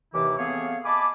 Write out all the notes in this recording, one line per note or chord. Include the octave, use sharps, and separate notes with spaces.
D#2 C3 E3 E4 D6
A3 B3 C4 G#4 C#5 F5
D#5 G#5 A5 B5 D6